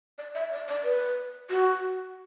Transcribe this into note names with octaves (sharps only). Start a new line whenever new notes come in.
D5
E5
D5
D5
B4
F#4